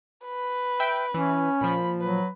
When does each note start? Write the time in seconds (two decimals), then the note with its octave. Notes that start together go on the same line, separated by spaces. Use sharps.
0.25 B4
0.80 E5 G5
1.14 E3 C#4
1.61 A#2 F3 B5
2.01 F#3 B4